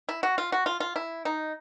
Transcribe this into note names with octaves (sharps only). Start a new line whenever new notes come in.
E4
F#4
F4
F#4
F4
F4
E4
D#4